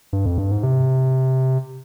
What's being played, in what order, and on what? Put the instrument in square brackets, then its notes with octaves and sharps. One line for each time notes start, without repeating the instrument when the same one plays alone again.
[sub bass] G2
F2
G2
G#2
C3